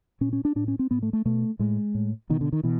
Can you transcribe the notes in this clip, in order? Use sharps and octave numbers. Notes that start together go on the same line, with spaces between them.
A#2 C#4
C#4
D4
A2 D4
C#4
C4
A2 B3
A3
A3
B2 A3
A2 G#3
A2
B2 D#3
D3
D#3
B2 E3